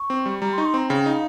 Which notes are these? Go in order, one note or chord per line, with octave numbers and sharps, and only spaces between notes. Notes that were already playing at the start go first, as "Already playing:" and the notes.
Already playing: C#6
C4
G3
G3 A#5
C6
D#4 C#6
C6
C4 A#5
C#3 G5
D#4 G5
F5